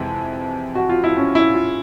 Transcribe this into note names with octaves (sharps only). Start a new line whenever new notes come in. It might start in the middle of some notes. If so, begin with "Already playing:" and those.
Already playing: F2 C3 E3 G#3
F#4
F4
E4
C#4
E4
F4